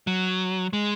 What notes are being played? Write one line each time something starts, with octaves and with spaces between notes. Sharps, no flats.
F#3
G#3